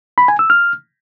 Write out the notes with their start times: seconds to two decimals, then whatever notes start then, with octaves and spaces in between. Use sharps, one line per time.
0.18 B5
0.28 G#5
0.39 E6
0.50 F6